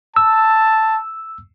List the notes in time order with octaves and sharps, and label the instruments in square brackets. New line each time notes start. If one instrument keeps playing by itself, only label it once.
[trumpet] A5 [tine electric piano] E6